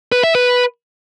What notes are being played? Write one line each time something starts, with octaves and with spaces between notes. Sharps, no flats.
B4
E5
B4